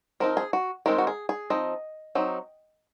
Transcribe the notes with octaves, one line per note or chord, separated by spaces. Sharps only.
F3 C4 D#4 A#4
G#4
F#4
D#3 G#3 C4 D#4 A#4
F#4
G#4
G#4
F3 C4 D#4 D#5
F#3 C4 D#4